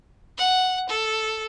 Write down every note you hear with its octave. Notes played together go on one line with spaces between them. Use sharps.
F#5
A4